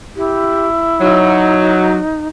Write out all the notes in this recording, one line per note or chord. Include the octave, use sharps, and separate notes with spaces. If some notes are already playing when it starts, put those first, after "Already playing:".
E4 G4
F#3 D#4